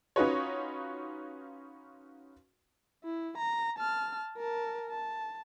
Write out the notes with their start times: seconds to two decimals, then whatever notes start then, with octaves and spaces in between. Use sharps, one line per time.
0.16 C#4 D#4 F4 F#4 B4 C#5
3.04 E4
3.38 A#5
3.78 A5 F6
4.38 A#4 A5
4.90 A5